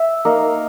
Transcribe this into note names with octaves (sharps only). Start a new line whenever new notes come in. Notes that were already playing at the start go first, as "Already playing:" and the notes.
Already playing: E5
A#3 D#4